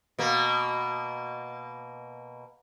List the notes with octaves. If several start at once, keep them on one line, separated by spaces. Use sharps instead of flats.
B2 A#3